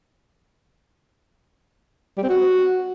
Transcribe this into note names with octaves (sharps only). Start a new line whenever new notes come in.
G3
C4
F#4